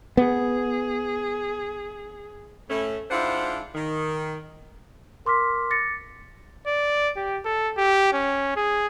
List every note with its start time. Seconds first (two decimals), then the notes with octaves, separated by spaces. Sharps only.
0.17 B3 G#4
2.69 A2 A3 C#4
3.11 G#2 D4 E4 F4 C5 F#5
3.75 D#3
5.26 A#4 C6 D6 F6 B6
5.70 D6 A6 A#6 C#7
6.67 D5
7.17 G4
7.45 A4
7.77 G4
8.13 C#4
8.56 G#4